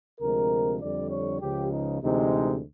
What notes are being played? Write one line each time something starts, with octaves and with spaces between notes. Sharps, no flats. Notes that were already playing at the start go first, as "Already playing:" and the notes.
D2 C3 F3 G#3 C4 A#4
F2 D3 G3 D5
C#5
C#2 C#3 F3 G4
D#4
D2 C3 E3 G#3 D#4